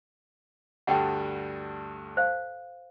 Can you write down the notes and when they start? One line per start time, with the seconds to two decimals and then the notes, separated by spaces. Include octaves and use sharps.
0.87 D2 G2 G3 F#5 G5
2.17 C5 F5